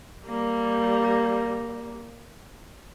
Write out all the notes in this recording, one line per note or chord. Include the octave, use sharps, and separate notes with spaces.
G3 A#3